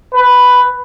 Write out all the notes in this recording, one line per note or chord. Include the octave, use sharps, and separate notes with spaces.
B4